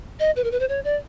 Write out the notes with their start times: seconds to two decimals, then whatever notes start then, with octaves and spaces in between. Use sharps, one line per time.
0.19 D#5
0.36 B4
0.44 A#4
0.52 B4
0.60 C5
0.69 C#5
0.84 D5